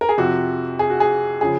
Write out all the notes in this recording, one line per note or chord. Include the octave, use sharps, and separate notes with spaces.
A#4
G#4
F2 C3 F3 F#4
G#4
F#4
G#4
C#3 F3 G#4